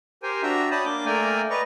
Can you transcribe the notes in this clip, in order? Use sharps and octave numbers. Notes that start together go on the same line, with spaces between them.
G4 A#4 C5 G5 G#5
D4 F#4 E5 G5 A#5
C#5 D5 G5 A5 B5 D#6
A#3 D4 D6 G6
A3 A#3 A#4 D5 G5 G#5
B4 D5 D#5 A#5 C#6